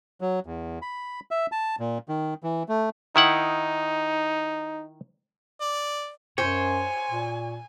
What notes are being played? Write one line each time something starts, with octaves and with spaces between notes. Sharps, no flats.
F#3
E2
B5
E5
A5
A#2
D#3
E3
A3
D#3 D#4 E4 F#5
D5
F#2 C5 C#5 G#5
A#2